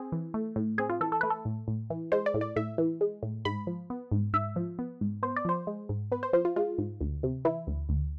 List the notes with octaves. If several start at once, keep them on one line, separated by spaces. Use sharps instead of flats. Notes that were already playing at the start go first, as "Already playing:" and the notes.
Already playing: C4 G#4
E3
A3
A2
C4 G#4
F4
E3 A4
A4
A3 B4
A4
A2
A2
E3
G#3 C5
D5
A2
D5
A2 E5
E3
G#3
A2
G#2 B5
F3
B3
G#2
G#2 E5
F3
B3
G#2
B3 C5
D5
F3 C5
G#3
G#2
B3 B4
C5
F3 C5
F4
G#3 F4
G#2
D2
C3
E3 E4
D2
D2